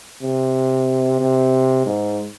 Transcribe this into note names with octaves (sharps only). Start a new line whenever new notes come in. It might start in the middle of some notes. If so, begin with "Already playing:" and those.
C3
C3
G#2